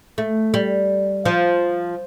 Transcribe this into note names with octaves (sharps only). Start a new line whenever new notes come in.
A3
G3
F3